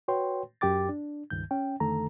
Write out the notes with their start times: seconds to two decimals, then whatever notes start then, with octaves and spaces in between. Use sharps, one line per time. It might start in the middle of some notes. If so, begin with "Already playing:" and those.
0.08 F#4 B4 C#5 G5 C6
0.61 F#2 G4 G5 D6 A6
0.89 D4
1.30 C#2 G2 D#3 G6
1.51 C#4 G5
1.80 F2 D3 D#3 A3 A4 A#5